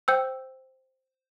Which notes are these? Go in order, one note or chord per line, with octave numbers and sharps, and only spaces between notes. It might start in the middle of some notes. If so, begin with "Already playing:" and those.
C5 G5 E6 G6